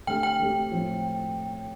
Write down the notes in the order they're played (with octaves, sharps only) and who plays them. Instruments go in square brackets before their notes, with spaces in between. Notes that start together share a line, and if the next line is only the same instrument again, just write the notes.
[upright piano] D3 A3 C4 G4 [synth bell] G5
[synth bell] G5
[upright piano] D3 A3 C4 G4
A2 F3 C4